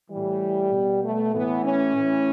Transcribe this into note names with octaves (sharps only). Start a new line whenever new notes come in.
A2 E3 G3
B2
A3
A2 E3 B3
C#4
A2 E3